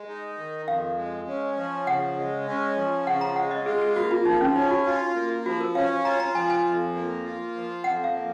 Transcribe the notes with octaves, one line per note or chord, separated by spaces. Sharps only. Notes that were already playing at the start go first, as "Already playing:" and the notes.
Already playing: G#3
D#4
D#3
F2 F5
G#3
C#4
F3
C#3 F#5
G#3
C#4
F3
C#3 F#5
A#5
G#3 F#5
D#5
F4 G#4
G#4
A#3 F#4
F4
F3 D#4
C#4
C#4 D#4
F#4
F4
A#3
F3 F#4
A#4
C#4 F5
F4 A#5
A#5
F3 G#5
G#5
F2
A#3
F4
F3
F2 F#5
F5
A#3